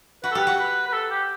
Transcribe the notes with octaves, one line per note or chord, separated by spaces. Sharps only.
F#4 B4
A4
G4 B4
F#4
B4
B4
A4
G4